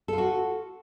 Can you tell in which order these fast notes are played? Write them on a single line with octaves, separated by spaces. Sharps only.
A4 F4 F#4